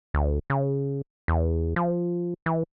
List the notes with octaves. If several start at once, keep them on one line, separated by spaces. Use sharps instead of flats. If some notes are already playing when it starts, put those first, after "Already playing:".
D2
C#3
E2
F3
E3